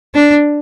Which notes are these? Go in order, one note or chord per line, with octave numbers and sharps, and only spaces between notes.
D4